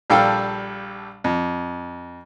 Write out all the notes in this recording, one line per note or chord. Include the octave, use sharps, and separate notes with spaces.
A#1 G3 A4 F5 G5
F2